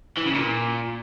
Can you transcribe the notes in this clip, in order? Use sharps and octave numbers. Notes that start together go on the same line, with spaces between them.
E3
C#3
A#2